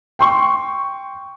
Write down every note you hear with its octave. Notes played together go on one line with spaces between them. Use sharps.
G5 C6 C#6